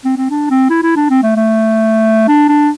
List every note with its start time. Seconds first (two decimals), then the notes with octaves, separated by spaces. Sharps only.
0.05 C4
0.17 C4
0.31 D4
0.50 C4
0.70 E4
0.83 E4
0.96 D4
1.10 C4
1.23 A3
1.36 A3
2.28 D4
2.49 D4